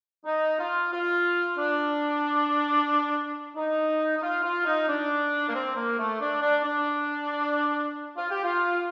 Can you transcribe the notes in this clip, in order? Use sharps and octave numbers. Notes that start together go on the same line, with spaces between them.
D#4
F4
F4
D4
D#4
D#4
F4
F4
D#4
D4
A#3
C4
A#3
A3
D4
D4
D4
F4
G4
F4